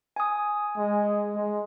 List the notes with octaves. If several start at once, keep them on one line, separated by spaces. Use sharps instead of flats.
G#5 D#6
G#3
G#3